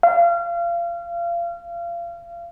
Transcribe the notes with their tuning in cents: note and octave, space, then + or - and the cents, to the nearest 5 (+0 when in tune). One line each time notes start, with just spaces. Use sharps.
F5 -30